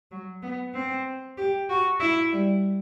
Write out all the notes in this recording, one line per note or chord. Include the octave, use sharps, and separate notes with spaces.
F#3
B3
C4
G4
F#4
E4
G3